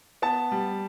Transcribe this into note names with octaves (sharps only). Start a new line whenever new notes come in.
B3 A5
G3